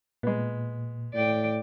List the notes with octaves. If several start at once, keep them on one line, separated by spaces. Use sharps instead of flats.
A#2 G#3 B3
A2 D5 G5